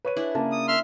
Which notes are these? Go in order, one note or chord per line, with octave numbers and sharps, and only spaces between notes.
B4 C#5 D#7
D4 E4 G#4
C#3 A#3 A5
D#6
E5 C6 F6